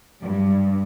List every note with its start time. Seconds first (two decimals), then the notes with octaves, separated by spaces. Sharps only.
0.22 G2